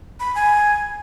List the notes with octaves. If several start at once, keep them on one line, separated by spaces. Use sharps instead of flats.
B5
G#5